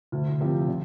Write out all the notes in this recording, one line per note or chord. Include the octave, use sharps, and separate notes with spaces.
D2
C3 F3 C4 G4
D3